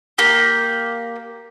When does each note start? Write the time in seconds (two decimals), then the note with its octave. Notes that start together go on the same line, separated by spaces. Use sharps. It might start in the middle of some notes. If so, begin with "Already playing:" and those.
0.18 A#3 G4